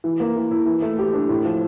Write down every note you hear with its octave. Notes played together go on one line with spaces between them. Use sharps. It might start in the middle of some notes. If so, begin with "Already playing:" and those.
E3
A#3
E3
E4
E3
A3
G4
D4
A2
F3